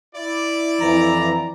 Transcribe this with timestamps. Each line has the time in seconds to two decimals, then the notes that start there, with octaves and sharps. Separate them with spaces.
0.15 E4 D5
0.81 F2 E3 A#5